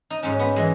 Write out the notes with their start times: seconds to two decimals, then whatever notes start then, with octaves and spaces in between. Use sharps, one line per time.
0.10 D#4
0.23 G#2 F#3 C#4
0.39 B3
0.56 E3 G#3